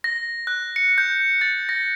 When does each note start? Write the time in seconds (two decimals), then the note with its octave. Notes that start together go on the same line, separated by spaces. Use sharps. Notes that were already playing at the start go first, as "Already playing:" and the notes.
0.04 A#6
0.47 F#6
0.76 C#7
0.98 G6
1.41 A6
1.69 A#6